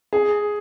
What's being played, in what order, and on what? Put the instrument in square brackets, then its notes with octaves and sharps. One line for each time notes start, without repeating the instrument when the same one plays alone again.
[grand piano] G#4